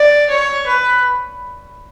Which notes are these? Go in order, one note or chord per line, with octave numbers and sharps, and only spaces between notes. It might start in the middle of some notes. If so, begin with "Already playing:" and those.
Already playing: D5
C#5
B4